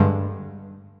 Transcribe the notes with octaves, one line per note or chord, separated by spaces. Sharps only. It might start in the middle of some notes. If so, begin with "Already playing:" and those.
Already playing: G2 D3 G#3